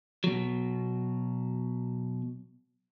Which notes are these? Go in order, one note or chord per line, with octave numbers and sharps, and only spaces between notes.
B2 F#3